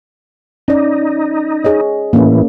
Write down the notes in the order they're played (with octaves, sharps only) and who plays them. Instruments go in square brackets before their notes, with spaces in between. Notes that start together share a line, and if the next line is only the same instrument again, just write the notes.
[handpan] C#4 D5 [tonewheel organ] D#4
[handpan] G#4 C#5 D#5
[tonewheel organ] A2 E3 [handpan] A#3 C#4